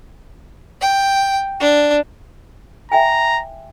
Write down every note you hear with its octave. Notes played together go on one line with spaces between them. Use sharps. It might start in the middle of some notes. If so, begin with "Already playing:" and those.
G5
D4
E5 G5 G#5 A#5